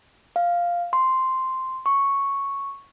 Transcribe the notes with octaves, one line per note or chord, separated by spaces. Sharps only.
F5
C6
C#6